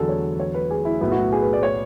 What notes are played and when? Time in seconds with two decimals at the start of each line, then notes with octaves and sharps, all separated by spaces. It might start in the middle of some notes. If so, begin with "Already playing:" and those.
Already playing: E2 D3 F#3 G#4 A4
0.09 C#5
0.40 C#5
0.54 B4
0.70 G#4
0.85 E4
1.01 B1 A2 F#3 B3 E4
1.12 F#4
1.32 G#4
1.42 B4
1.53 D5
1.63 C#5